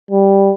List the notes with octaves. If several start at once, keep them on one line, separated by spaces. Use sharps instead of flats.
G3